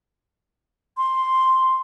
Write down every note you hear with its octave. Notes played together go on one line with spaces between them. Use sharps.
C6